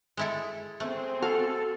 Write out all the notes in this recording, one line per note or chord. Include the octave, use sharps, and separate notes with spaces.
G#3 E4 A4
A3 C4 G#4
F#4 A4 F5